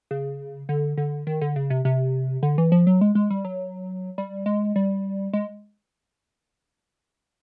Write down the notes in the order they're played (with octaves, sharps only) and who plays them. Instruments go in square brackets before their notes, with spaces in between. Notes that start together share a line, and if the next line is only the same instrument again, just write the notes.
[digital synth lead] C#3
D3
D3
D#3
D3
C#3
C3
C3
D3
E3
F3
F#3
G#3
G#3
G3
F#3
G3
G#3
G3
G#3